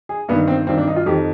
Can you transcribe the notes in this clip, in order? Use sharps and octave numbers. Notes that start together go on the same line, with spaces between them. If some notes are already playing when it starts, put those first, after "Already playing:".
G#4
G2 D#3 B3
C4
G2 D#3 C4
D4
D#4
F4
F2 D#3 G4